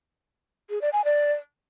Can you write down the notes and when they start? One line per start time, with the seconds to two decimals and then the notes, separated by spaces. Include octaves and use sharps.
0.70 G#4
0.81 D5
0.93 G#5
1.05 D5